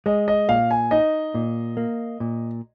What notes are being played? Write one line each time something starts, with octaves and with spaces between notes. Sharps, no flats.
G#3 D#5
D#5
A#2 F5
G#5
D#4 D#5
A#2
A#3
A#2